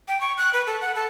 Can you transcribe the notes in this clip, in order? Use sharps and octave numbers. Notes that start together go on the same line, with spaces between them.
G5
C#6
F#6
B4
A4
F#5
A4